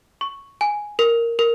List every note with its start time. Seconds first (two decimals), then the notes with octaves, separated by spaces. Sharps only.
0.21 C#6
0.61 G#5
0.99 A#4
1.39 A#4